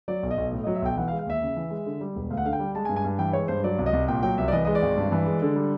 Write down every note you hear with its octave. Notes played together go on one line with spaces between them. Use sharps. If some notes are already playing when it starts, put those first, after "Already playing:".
F#3 D5
B1
D#5
B1
A2
D#5
F#3
E5
B1 G5
E3 F#5
F5
G#3
F5
D#2 E5
C#3
E3
G#3
D3
G3
E1
D2 F5
F#5
D3 F5
G5
G3
G#3 A5
G#5
G2
G#5
G2
E3 G5
G#3 C#5
G2 C5
F#3 D5
C2
D#5
C2
A#2 G5
F#3 G5
C2 E5
D5
E3 D#5
G#3 D#5
D5
G#1
G2
E3
G#3
D3
G3